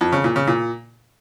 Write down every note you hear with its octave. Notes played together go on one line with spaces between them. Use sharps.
F2
C#3
A#2
C#3
A#2